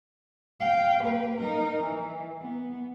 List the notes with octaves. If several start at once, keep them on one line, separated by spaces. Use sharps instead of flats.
F5 G5
A#3 B4
D#4 A#4
E3
B3